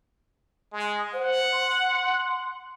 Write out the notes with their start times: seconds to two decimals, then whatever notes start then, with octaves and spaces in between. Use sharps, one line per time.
0.73 G#3
1.13 C5 F#5
1.52 C6